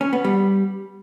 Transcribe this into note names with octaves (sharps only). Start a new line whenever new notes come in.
C#4
B3
G3